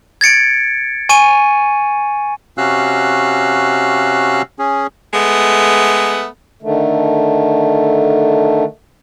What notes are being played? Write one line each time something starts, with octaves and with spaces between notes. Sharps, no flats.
G#6 A6 C#7 D7
G#5 C#6 D#7
C3 C#4 F#4 F5 E6 F#6
C#4 G#4
G#3 A3 B3
D3 D#3 A3